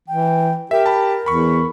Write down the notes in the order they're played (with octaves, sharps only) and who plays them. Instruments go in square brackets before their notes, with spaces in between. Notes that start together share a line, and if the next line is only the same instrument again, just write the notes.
[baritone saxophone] E3 [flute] G5
[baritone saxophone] G4 [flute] A#4 [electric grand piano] E5
[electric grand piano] A5 B5
[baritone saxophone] E2 [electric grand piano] B5 C#6